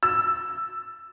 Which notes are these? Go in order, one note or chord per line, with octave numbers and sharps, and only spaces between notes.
E6